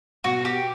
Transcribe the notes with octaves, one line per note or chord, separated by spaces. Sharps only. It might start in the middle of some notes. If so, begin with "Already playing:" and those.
B2 F#4
G4